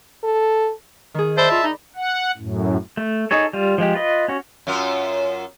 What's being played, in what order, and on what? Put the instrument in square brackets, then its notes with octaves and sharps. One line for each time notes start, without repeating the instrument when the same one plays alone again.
[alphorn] A4
[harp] D#3 G#4
[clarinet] C5 [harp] D5 B5 [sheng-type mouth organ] E5 A5
[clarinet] F4
D#4
[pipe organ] F#5
F#2 A2
[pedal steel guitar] A3
D#4 G#4 A4 C#5
G3 F4
F3 G#3 G4
F4 B4 D#5
C#4 F#4
[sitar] F#2 F4